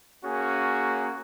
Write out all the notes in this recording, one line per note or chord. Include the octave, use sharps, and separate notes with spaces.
A#3 C#4 F#4 G#4